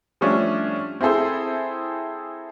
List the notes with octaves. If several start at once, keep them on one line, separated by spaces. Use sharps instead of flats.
F3 G3 A3 C#4 D4
C4 E4 G#4 A4 C5